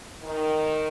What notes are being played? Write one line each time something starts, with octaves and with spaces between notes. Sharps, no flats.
D#3